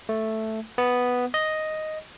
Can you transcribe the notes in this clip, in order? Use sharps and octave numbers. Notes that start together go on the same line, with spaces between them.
A3
B3
D#5